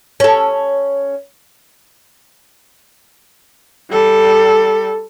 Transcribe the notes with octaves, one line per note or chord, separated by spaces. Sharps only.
C#4 A4
G3 A4